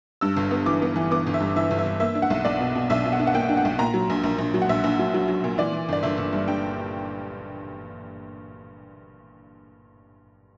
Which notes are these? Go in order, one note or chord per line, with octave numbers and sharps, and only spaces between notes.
G2 E6
G1
B3
E3 D6
B3
E3
B3 D6
G1
E5
G2
E3 E5
G1
E5
G1
A#3 E5
D4
F#5
B1
B1 D5
B2
B2
B1 E5
B2
F#5
D4
F#5
A#3 G5
D4
F#5
B1
A#2 A#5
F#3
A#1
A#1
A#1
F#3
F#5
A#1 E5
A#1
F#3
F#3
F#3
A#2
E3 D5
E3
G1 D5
G1 E5
G1
G2
G2 G5